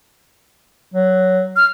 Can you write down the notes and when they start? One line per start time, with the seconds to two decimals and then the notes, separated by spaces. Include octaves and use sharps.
0.94 F#3
1.56 F6